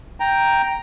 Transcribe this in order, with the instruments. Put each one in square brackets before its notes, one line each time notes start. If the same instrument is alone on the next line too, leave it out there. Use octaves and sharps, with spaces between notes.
[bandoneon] G5 A#5